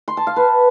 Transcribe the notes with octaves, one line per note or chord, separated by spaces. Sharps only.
C6
A5
F5
B4